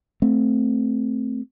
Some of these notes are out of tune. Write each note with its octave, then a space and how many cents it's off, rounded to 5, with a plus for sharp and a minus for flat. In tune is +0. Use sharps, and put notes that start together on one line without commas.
A3 +0 C4 +0